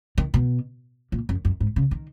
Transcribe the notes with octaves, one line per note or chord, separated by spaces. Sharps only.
D#3
B2
A#2
F#2
F#2
G#2
C#3
D#3